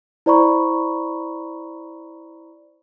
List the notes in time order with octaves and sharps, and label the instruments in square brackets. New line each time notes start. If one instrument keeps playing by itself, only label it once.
[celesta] E4 C5 D5 A#5 B5 C#6